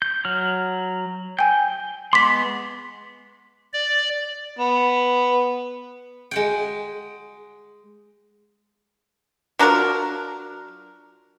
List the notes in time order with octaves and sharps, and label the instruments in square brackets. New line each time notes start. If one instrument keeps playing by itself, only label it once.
[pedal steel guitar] G6
F#3 F6
[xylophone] G5 G#5 [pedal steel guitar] G6
[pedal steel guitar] G#3 B3 C6 [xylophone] D6 B6
[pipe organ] D5
[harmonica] B3
[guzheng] G#3 F#5 G5
[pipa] F#3 D4 F4 A#4